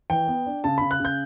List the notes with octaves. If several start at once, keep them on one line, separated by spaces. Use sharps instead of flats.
E3 G5
B3
D4
C#3 A5
C#3 B5
F#6
C#3 G6